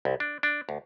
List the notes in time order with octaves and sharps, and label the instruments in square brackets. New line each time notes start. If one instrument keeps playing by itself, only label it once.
[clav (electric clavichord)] C2
D4
D4
D2